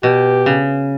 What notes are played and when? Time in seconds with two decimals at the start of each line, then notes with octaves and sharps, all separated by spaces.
0.03 B2 G4
0.46 C#3